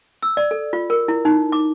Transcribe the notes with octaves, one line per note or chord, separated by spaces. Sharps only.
E6
D5
A4
F4
A#4
E4
D#4
D6